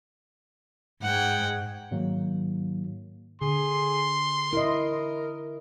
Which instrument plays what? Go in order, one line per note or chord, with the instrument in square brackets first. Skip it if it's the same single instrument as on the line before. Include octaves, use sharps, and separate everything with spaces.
[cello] G#2 G#3 [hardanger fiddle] F#5 G5
[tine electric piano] G#2 D#3 F#3 A#3
[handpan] D3 [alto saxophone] G#4 [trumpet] C6
[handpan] E4 D#5 [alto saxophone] A#4